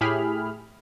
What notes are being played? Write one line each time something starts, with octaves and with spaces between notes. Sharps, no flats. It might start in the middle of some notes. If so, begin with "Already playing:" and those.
A2 E4 G4 G#4 B5 F6